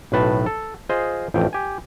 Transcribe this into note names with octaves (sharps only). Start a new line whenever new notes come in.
B1 A2 B4 A5
A4
F4 G#4 C5 D#5
A1 F2 G5
G4 G#5